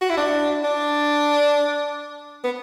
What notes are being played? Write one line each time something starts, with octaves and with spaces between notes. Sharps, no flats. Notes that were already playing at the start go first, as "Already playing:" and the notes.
F#4
E4
D4
D4
B3